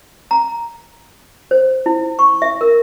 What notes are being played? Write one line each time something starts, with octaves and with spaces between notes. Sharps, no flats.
A#5
C5
E4
C#6
E5
A#4